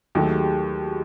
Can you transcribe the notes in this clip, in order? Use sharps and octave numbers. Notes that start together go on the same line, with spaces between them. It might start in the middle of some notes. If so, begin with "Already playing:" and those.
D#2 D#3 F#3 A3 G#4
G4
F#4
G4